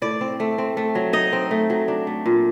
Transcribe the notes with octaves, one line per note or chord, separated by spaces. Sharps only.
A2 D5
C4
A3
C4
A3
F#3
D#4 D#5
C4
A3
F#3
D4
A3
A#2